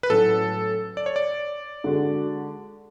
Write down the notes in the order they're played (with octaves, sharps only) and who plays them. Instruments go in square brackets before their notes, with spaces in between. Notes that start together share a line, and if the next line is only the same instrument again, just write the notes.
[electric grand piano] B4
[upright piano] A2 F#3 A3 C#4 [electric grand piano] A4
[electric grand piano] D5
C#5
D5
[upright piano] D3 G#3 D4 F#4